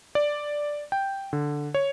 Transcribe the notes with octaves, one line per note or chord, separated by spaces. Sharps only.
D5
G5
D3
C#5